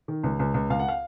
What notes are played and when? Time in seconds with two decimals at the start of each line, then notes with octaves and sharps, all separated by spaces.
0.08 D#3
0.23 C#2
0.39 C#2
0.54 C#2
0.70 C#2 F5
0.79 F#5
0.89 F5